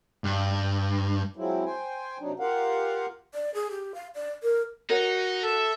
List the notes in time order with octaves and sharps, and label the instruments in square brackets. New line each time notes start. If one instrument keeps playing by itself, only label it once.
[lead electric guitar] G2
[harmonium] F3 F#3 G#3 C4 E4
C5 G5 G#5
C3 F#3 D4 D#4
F4 G4 A#4 F5 F#5
[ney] D5
G#4
G4
F5
D5
A#4
[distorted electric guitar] D#4 [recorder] F#4 [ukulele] A#4 C#5
[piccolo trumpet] A4 [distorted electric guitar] E5